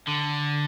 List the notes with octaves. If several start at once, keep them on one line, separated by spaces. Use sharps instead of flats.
D3